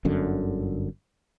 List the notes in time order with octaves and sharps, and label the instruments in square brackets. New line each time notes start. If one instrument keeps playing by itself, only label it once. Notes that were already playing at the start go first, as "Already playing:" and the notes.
[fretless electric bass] G1 F#2 D3